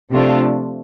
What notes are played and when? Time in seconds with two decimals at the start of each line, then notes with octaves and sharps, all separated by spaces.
0.11 C3 F3 A3 D4 F4